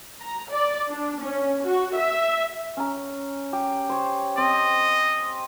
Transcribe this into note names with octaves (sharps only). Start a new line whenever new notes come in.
A#5
D5
D4
C#4
F#4
E5
C#4 A#5
G4
C5 C#5
C4 D#5